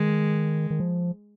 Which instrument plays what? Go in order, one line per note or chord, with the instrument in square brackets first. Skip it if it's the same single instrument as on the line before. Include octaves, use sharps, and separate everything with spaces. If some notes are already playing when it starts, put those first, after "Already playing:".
Already playing: [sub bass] D#3 [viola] G#3
[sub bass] D#3
F3